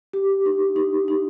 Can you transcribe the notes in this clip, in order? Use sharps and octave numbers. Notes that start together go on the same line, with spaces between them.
G4
D#4
D#4
D#4